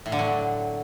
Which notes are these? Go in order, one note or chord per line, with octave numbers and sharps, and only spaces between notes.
A2
D3
F#3